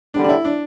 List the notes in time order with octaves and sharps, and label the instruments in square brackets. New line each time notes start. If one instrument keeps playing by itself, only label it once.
[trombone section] E2 D3 G3 [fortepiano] D4
[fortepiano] D4
E4
D4